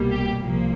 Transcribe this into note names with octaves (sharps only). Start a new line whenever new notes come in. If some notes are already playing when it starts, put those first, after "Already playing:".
Already playing: C2 B2 G3 A#3
G4
C2 A#2 F3 A#3